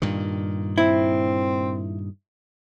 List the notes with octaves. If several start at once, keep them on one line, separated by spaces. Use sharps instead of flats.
G2 A#2 D#3
C4 E4